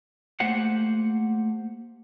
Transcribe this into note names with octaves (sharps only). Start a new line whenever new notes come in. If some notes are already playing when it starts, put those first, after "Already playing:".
A3 A#3 G4 C5 F#5